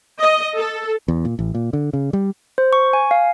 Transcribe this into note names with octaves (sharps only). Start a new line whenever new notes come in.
D#5
A4
E2
A#2
A1
A#2
D3
C#3
G3
C5
C#6
G#5
F5